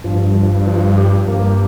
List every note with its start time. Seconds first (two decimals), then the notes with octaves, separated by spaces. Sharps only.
0.04 G2 F3
0.35 F3
0.67 F3
0.98 G4
1.28 G2 A#3